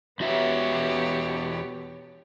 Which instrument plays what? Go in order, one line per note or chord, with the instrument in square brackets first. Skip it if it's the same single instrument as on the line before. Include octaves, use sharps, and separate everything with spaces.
[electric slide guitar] E2 F#4 E5 [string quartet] B3 G4 C#5